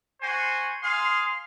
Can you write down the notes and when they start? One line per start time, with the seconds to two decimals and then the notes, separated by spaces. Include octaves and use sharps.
0.22 F#4 C5 G#5
0.81 G#4 F5 C6